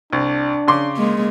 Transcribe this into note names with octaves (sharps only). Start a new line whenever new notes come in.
C2 D4
C#3 C6 D6
G#3 A#3